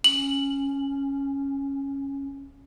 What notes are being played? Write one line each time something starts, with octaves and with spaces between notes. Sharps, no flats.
C#4 F#7